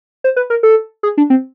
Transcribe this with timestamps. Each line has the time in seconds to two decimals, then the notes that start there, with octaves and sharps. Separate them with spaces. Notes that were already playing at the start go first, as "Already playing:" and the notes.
0.24 C5
0.36 B4
0.50 A#4
0.63 A4
1.03 G#4
1.18 D4
1.30 C4